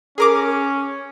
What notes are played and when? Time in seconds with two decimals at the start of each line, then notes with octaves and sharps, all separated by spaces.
0.18 C#4 G#4 A#4 D6